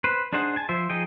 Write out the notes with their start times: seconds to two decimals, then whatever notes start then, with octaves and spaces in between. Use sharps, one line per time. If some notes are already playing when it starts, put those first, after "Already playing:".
0.04 B4 C5
0.33 D4 D#4 G#4 C5 F#5
0.56 G#5 A5
0.69 F3 C5 E5
0.90 F3 D#4 G#4 D#5 G5